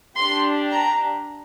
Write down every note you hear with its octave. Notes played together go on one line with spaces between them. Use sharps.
D4 G4 C6
A#5